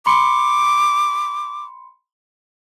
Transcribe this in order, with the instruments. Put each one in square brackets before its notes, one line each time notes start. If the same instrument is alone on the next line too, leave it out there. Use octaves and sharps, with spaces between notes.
[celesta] B5 C6 C#7 [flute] D6